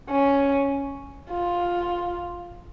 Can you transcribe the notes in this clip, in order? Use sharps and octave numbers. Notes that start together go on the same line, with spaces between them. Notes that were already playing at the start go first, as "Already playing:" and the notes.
C#4
F4